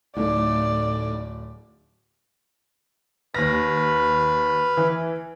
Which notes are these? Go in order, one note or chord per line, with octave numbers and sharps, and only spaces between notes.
D1 A2 A3 D#4 D5
D#2 B4 B5 F6 A#6
E3